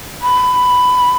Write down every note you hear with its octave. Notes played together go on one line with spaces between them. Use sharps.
B5